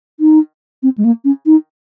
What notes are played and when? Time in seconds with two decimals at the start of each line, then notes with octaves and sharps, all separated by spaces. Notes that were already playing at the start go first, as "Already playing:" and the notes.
0.20 D#4
0.83 C4
0.98 G#3
1.04 A#3
1.25 C#4
1.46 D#4